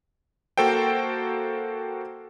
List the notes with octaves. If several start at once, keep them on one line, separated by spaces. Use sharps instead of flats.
A#3 F#4 A4 C5 G5